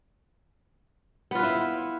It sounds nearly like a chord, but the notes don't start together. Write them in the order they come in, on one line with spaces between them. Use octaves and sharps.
B3 F4 B4 E4